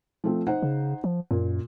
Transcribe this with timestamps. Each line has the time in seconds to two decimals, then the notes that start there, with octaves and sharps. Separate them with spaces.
0.24 F3 A3 C4
0.47 D#4 C5 F#5
0.62 C#3
1.04 F3
1.31 F#2 A#2